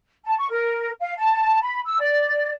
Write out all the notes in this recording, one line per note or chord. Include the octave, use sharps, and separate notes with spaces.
A5
C#6
A#4
F5
A5
B5
E6
D5